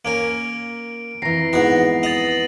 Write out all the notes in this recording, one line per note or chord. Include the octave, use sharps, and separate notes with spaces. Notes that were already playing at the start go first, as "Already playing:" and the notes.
A#3 C#4 A#4 D7
F2 E3 A#5 A#6 C7
G#2 B3 F#4
D#5 D#6 A6 F7 F#7